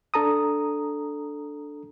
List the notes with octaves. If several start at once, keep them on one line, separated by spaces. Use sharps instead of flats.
D4 A4 A#5 D#6